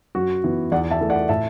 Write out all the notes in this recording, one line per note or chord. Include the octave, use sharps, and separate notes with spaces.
F#2 F#4
E3 B3
E2 D5 F#5
E5 A5
E3 A3
D5 F#5
A2 E5 A5